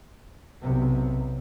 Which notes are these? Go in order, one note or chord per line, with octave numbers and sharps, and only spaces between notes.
B1 C3